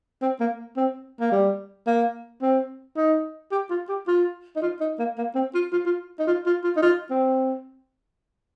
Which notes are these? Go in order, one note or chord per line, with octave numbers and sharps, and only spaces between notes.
C4
A#3
C4
A#3
G3
A#3
C4
D#4
G4
F4
G4
F4
D#4
F4
D#4
A#3
A#3
C4
F4
F4
F4
D#4
F4
F4
F4
D#4
F4
C4